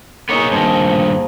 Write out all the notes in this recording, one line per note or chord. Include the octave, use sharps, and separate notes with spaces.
A#3 B3 D#4 G#4 C#5
G2 D#3 F3